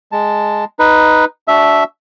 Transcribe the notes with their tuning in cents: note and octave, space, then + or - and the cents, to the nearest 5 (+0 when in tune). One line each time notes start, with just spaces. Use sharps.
G#3 +0 A5 +0
D#4 +0 B4 +0
D4 -15 F#4 +0 E5 -5